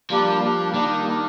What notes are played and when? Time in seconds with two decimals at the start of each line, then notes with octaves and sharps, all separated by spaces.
0.10 F3 G3 A#3 D4 G4
0.42 G3 A#3 D4 G4
0.74 D#3 G3 A#3 D4 G4
1.07 G3 A#3 D4 G4